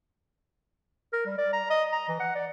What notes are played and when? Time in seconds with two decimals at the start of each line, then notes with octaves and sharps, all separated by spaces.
1.13 A#4
1.26 G3
1.38 D5
1.53 A#5
1.70 D#5
1.92 A#5
2.08 E3
2.20 F#5
2.36 D5